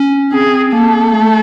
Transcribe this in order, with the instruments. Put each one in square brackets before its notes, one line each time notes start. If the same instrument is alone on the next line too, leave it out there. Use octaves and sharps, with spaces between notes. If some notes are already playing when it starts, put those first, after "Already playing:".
Already playing: [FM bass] C#4
[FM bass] C4 [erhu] G#4
[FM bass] A#3 [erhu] A4
[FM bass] A3